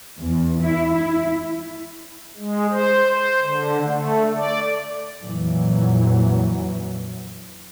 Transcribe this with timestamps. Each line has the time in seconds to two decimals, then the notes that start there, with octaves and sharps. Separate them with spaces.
0.20 E2
0.62 E4
0.95 E4
2.37 G#3
2.70 C5
3.10 C5
3.42 D3
3.85 A3
4.36 D5
5.20 F2 A#2 E3 F#3